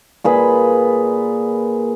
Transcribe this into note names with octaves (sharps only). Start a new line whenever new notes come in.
A#2 G#4 B4